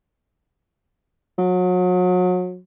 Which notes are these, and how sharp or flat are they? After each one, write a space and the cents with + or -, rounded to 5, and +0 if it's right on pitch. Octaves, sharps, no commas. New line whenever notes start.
F#3 -35